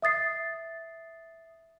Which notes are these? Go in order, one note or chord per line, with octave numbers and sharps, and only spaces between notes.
E5 D#6 A6 C7